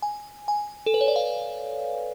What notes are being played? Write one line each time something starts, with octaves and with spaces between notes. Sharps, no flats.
G#5
G#5
A4
B4
C#5
D5
F5